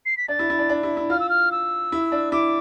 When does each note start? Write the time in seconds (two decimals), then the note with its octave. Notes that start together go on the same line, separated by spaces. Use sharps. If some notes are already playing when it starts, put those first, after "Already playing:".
0.06 C7
0.17 B6
0.28 D4 A6
0.39 E4
0.50 E4
0.59 D4
0.69 D4
0.83 E4
0.97 E4
1.10 F4 F6
1.20 E6
1.29 F6
1.52 E6
1.92 E4
2.12 D4
2.32 E4 D6